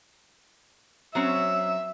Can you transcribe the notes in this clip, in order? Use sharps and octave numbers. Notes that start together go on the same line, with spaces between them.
F#3 C4 C#4 E5